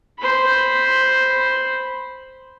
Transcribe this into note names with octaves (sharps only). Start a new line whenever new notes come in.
C5 B5